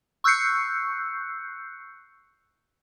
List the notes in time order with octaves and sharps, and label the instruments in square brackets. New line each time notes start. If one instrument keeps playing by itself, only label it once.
[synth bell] C#6 E6 F#6 G6 C7 C#7